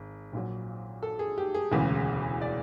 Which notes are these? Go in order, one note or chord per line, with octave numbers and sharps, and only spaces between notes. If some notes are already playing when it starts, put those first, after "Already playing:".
Already playing: G#1
A#1 A#2 F#3
A4
G#4
G4
G#4
E1 D2 C#3 E3
D5